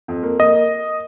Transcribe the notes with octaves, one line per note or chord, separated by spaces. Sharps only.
F2
A#3
A#3 D#5